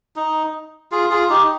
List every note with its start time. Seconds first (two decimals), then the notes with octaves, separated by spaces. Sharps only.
0.16 D#4
0.92 F4 G#4
1.10 F4 G#4
1.29 D#4 G4